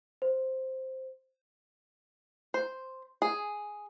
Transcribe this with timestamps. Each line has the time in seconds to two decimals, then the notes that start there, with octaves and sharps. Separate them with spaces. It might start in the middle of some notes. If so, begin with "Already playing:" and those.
0.22 C5
2.54 C5
3.22 G#4